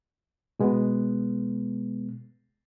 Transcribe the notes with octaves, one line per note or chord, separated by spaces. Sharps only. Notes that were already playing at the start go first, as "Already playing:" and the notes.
B2 G#3 B3